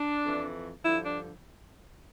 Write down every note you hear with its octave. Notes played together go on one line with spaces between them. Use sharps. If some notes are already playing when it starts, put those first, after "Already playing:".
Already playing: D4
F2 E3
G2 D3 F3 E4
D4